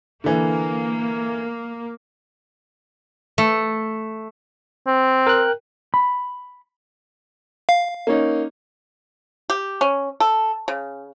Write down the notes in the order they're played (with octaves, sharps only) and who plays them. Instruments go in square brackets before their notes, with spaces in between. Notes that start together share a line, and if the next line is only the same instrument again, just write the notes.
[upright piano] D3 E3 [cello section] A#3
[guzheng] A3
[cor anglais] C4
[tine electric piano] A#4 G5 F#6
[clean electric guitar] B5
[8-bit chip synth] F5
[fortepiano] A#3 C#4 D#4
[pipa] G4
C#4
A4
C#3